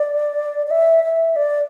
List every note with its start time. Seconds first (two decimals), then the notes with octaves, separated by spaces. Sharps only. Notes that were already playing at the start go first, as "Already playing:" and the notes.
Already playing: D5
0.67 D5
0.70 E5
1.04 E5
1.36 D5